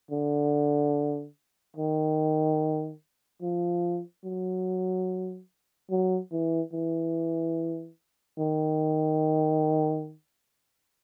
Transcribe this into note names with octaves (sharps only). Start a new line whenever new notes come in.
D3
D#3
F3
F#3
F#3
E3
E3
D#3